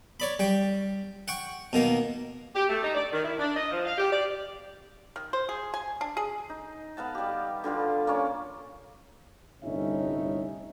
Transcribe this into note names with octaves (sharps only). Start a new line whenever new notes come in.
C#5 D5 B5
G3 G5
F#5 G5 C#6
B2 D#3 A#3
G4
A3
D#4
D5
D#3
E4
D4
D#5
F3
F5
G4
D5
D#3
C5
G#4
G#5
D4
G#4
D#4
B3 F5 F#5 A5
G3 G4
D3 G3 F4 B4
A#3 C#4 C#5 D5
G1 C2 A2 C#4 D#4 E5